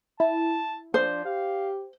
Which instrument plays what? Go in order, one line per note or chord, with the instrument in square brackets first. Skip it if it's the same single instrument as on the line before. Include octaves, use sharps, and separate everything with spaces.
[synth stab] E4 [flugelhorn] A5
[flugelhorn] F3 [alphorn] D4 [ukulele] C5
[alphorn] G4 [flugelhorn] F5